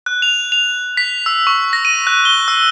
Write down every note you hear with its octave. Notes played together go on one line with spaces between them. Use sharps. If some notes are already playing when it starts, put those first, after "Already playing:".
F#6
F7
F7
B6
E6
C#6
A#6
D#7
F#6
G7
E6